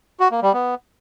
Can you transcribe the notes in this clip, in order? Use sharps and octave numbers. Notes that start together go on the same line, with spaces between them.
F#4
A#3
G3
B3